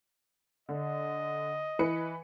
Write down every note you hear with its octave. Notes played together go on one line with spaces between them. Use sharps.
D3 D#5
E3 B4 C#7